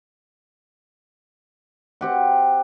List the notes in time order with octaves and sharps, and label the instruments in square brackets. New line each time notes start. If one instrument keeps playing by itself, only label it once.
[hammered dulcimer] C4 G4 F#5